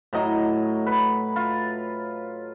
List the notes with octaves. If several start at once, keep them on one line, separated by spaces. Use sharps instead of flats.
A2 F#3 D#5 A#5
B4
F4